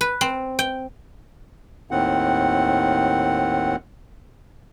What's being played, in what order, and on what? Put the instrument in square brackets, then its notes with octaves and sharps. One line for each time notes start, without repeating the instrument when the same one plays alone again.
[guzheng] B4
C4
G5
[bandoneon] D#2 A2 D#3 C4 F#5